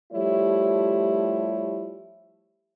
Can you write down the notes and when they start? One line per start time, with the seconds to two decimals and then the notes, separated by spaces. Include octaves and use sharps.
0.13 F3 G3 A3 E4 G4 C#5